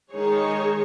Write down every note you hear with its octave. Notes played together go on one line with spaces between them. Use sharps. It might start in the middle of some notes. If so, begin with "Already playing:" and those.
D#3 G#3 D#4 G#4 C#5